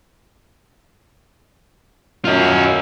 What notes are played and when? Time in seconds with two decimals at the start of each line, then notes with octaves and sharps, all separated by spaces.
2.25 F#2 F4 D#5